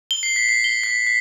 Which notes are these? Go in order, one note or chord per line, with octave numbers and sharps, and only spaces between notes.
G7
C7
B6
C7
G7
B6
B6